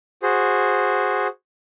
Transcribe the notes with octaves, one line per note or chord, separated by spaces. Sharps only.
F#4 G#4 C5